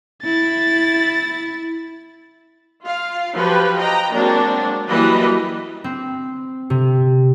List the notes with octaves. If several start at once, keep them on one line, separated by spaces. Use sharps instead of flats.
E4 A6
F4 F5
F3 F#3 G4 B4
D#5 G5 A#5
F#3 G#3 A#3 C4 D4
E3 F#3 G3 A#3 B4 D#5
C4
C3